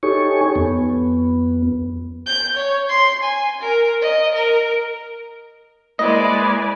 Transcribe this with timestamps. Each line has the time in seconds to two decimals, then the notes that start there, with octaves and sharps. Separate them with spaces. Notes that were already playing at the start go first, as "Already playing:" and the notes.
0.03 D#4 G4 A4 C#5 G#5 C#6
0.55 F2 B3
2.26 G6
2.57 C#5
2.89 C6
3.23 G#5
3.61 A#4
4.01 D#5
4.35 A#4
5.99 G#3 A#3 E4 B4 C5 D5 D#5 G#5